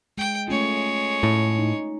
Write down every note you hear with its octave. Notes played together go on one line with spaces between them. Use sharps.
G#3 G5
G#3 A3 C#4 F4 C#5
A2
D#4